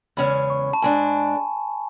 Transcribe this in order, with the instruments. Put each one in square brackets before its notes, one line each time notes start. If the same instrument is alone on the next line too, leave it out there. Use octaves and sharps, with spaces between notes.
[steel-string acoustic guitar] E2 C#3 G#3 C#4 [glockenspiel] B5
[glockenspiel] C#6
A5
[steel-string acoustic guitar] G#2 G#3 D4 [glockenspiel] G#5